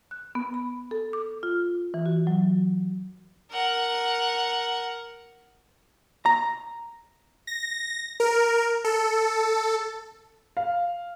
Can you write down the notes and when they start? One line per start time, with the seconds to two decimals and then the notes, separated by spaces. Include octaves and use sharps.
0.11 F#6
0.35 B3
0.54 B5
0.91 A4
1.13 D6
1.43 F4
1.94 E3
2.06 F#4
2.27 F#3
3.51 A#4 F#5
6.26 A#5
7.47 A#6
8.20 A#4
8.84 A4
10.57 F5